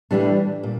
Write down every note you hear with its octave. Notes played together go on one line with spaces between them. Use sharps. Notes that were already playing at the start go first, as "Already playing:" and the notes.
A2 E3 G3 D4
A#2